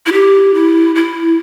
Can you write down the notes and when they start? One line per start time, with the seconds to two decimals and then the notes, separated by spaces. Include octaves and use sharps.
0.06 E4
0.13 G4
0.54 E4
0.95 E4